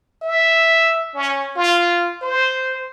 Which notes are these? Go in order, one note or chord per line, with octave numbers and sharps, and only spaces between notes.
E5
C#4
F4
C5